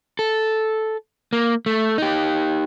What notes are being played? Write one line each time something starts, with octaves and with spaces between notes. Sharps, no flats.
A4
A#3
A3
D#4 G4